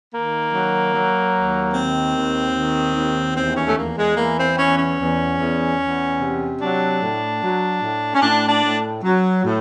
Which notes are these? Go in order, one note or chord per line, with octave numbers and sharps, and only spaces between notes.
D#3 A#3
F#3
F#3
D#2
D#3 C4
D#2
D#3
D#2
E2 C4
C#4
A3
E2 A#3
G#3
E3 A#3
C4
E2 C#4
C#4
E2
E2
E2
C3
F#3 D4
A2
F#3
A2
C#4
A2 D4
D4
A2
F#3
A2